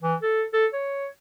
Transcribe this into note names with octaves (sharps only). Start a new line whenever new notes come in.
E3
A4
A4
C#5